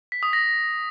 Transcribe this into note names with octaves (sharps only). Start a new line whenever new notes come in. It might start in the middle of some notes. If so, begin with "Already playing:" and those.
B6
D#6
A#6